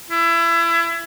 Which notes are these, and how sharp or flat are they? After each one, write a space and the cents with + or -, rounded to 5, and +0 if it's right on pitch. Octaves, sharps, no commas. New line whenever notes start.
E4 +30